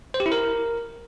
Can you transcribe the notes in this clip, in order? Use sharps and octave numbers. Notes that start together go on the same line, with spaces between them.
C5
G4
E4
A#4